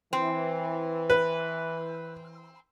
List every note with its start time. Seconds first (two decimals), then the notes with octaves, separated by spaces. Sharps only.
0.13 E3 C4
1.10 B4